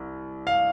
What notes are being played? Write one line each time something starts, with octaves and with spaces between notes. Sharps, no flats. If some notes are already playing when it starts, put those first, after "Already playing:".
Already playing: C2
F5